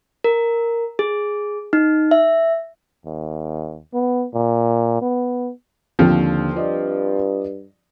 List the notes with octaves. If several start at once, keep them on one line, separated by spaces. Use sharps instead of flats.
A#4
G#4
D#4
E5
D#2
B3
A#2
B3
D#2 D3 F3 C4
G2 F4 D5 D#5